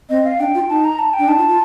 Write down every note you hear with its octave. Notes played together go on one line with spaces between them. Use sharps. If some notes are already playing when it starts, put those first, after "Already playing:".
C4 D#5
F5
D4 G5
F4
D#4 A5
A#5
A5
G5
D4
D#4 A5
F4
F4